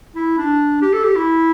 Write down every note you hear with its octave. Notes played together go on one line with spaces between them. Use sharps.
E4
D4
G4
A4
G4
E4